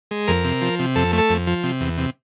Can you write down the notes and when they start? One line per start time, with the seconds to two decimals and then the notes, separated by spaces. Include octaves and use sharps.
0.11 G#3
0.28 F2 A#4
0.45 C3
0.61 F3
0.79 C3
0.96 F2 A4
1.13 A3
1.18 A4
1.30 F2
1.47 F3
1.64 C3
1.81 E2
1.98 C3